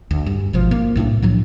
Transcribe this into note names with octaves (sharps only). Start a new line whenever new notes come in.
D2
G2
G#1 B2 F3
A#3
C2 A2 C#4 D4
A2 F3 F#3